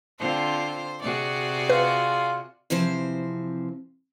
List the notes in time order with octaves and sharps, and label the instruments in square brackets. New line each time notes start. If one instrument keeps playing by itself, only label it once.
[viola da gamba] D3 C4 F4 [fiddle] C5
[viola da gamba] C3 F#4 [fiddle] G#4 D5
[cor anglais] F4 [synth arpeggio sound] B4
[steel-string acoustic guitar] C3 E3 F3 C4 C5